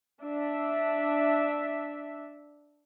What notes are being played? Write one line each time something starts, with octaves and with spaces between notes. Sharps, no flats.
D4 E5